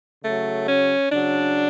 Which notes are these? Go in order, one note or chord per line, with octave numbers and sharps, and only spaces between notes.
C#3 F#3 A3
C#4
C#3 F#3 D4